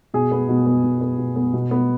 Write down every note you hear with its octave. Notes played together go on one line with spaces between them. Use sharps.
B2 G#4
B3
B2
B3
B2
B3
B2
B3
B2
B3